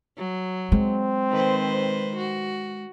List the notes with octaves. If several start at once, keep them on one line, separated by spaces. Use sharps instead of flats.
F#3
G#3 C4
D#3 B4 C5
F#4